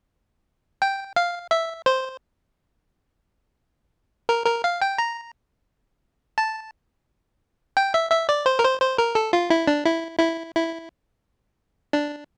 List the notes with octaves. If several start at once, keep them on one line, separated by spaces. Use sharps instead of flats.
G5
F5
E5
C5
A#4
A#4
F5
G5
A#5
A5
G5
E5
E5
D5
C5
A#4
C5
C5
A#4
A4
F4
E4
D4
E4
E4
E4
D4